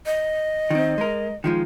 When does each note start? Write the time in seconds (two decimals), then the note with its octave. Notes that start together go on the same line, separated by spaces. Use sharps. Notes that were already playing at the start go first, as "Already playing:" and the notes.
0.06 D#5
0.70 D#3 C4
0.98 G#3 A#4
1.44 D#3 F3 G#3